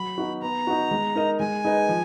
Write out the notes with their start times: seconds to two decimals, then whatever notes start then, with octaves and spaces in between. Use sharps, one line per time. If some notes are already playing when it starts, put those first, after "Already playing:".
Already playing: F#3 B5
0.18 B3 D#4 F#4
0.42 B3 A#5
0.67 D#4 F#4
0.91 G#3
1.15 D#4 A#4 D#5
1.40 G#3 G#5
1.65 D#4 G#4 B4 D#5
1.89 F3